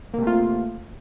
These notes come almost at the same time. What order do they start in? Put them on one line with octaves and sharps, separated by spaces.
A#3 C3 A3 F4